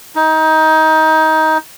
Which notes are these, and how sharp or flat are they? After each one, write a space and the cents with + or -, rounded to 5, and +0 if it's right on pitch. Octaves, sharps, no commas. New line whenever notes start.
D#4 +20